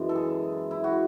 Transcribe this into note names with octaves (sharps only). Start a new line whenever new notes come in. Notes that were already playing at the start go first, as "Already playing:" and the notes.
Already playing: F#2 E3 G#3 B3
A4
G#4
E4
F#4